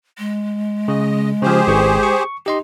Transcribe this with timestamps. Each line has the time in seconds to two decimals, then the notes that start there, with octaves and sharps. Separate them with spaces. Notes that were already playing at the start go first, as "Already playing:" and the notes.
0.18 G#3
0.88 C#3 D#5
1.42 C#3 F3 G4 G#4 C5
1.67 G#1 C#6
2.03 C#6
2.46 D#4 G4 D#5 C6